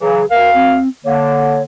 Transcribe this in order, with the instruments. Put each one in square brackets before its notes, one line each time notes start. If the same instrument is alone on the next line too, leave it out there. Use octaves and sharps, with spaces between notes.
[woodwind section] C#3 E3 F#3 [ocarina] G#4
[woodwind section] D2 F5 [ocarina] A#4
[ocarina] C4
[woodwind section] D3 A#3 [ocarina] C#5